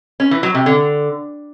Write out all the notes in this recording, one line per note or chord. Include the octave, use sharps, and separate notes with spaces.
C#4
E3
F#3
C3
D3